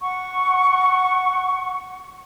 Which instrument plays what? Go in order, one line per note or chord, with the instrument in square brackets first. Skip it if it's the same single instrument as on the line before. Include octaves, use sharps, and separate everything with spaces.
[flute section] F#5 C#6